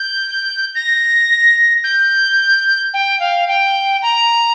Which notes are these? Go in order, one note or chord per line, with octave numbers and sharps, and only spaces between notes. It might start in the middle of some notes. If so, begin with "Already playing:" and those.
Already playing: G6
A#6
G6
G5
F5
G5
A#5